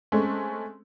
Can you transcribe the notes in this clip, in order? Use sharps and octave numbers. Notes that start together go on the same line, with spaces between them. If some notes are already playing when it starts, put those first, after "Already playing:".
G#3 A3 C4 C#4